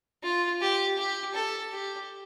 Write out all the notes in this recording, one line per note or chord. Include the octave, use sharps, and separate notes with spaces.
F4
G4
G4
A4
G4